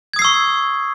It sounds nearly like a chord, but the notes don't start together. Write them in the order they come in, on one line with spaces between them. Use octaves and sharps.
G#6 D#6 C7 E6 C#6